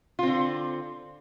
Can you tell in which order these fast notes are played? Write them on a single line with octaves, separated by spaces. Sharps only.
F4 C4 D3